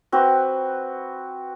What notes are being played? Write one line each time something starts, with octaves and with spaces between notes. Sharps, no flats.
C4 F#4 B4